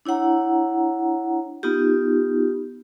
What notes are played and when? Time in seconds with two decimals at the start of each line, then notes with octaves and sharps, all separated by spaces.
0.05 D4 E4 C#5 F#5 A#5
1.63 B3 D#4 F4 G4